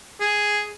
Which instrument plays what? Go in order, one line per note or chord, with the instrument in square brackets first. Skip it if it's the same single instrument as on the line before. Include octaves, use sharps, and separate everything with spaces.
[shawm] G#4